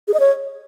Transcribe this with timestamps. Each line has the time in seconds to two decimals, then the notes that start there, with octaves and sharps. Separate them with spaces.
0.08 G#4
0.14 D#5
0.20 C#5